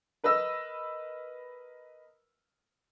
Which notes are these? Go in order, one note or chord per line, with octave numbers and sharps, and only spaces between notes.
A#4 B4 D#5 E6